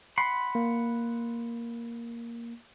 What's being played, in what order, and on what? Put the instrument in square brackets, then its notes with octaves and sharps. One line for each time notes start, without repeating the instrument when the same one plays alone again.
[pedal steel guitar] F#5 B5 C6
[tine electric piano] A#3